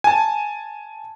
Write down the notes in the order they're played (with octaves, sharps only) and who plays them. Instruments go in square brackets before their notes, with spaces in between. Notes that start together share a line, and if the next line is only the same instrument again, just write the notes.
[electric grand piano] G#5 A5